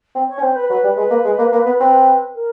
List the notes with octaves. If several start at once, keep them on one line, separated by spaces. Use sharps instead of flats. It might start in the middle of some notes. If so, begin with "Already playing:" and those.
C4
C#5
C#4
C4 C5
B4
F#3 B4
G3
G#3 B4
A#3
G#3
A#3
A#3
B3
C4
A#4